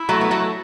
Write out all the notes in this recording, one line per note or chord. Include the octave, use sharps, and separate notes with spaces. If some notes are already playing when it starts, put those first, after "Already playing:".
Already playing: E4
F#3 A3
B3
F#3 A3